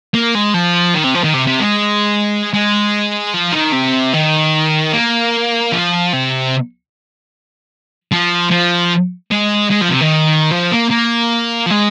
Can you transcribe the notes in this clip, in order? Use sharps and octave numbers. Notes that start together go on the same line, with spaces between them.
A#3
G#3
F3
D#3
C3
F3
D#3
C3
C3
G#3
G#3
F3
D#3
C3
D#3
A#3
F3
C3
F3
F3
G#3
G#3
F3
C3
D#3
F3
A#3
A#3
F3
G#3